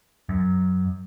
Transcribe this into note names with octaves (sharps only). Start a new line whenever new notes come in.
F#2